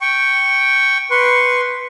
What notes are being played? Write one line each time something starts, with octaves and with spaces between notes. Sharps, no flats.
G5 C#6
B4 C6 C#6